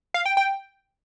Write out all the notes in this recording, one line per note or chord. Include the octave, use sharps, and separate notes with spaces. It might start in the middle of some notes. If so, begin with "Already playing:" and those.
F5
G5
G5